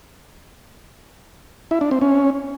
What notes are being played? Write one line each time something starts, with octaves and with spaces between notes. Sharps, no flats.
E4
D4
C4
C#4